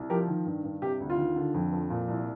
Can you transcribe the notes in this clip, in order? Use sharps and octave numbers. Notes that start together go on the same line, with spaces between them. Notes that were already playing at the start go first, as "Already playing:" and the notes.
Already playing: C2
F3 G4 A#4
D#3
G2
G2
C3 G4
D2
F4
D#3
D3
F2
F3
A#2
C2